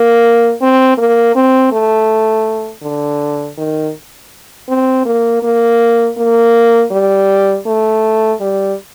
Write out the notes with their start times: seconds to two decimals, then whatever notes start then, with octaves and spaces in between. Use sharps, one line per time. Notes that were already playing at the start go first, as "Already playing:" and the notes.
Already playing: A#3
0.61 C4
0.98 A#3
1.36 C4
1.72 A3
2.83 D3
3.58 D#3
4.69 C4
5.06 A#3
5.43 A#3
6.18 A#3
6.91 G3
7.67 A3
8.41 G3